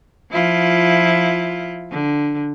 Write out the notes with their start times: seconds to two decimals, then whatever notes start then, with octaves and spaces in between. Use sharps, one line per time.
0.31 F3 E4 F4
1.91 D3